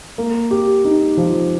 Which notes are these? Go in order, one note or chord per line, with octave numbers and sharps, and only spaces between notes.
A#3
G4
D#4
F3